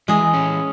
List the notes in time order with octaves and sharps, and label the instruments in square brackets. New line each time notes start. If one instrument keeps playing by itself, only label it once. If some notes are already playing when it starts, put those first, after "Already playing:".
[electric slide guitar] E3 [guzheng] G#3 G#4
[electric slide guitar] C#4